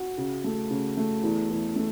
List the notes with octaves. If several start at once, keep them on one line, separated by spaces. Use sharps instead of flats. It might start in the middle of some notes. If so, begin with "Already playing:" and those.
Already playing: F#4
C#3
A3
C#3
A3
E2
E2
A3